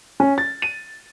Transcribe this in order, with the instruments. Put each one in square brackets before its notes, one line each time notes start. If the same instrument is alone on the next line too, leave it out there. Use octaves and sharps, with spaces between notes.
[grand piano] C#4
A6
D#7